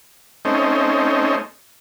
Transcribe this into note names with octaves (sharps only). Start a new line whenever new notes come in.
A3 C4 C#4 D#4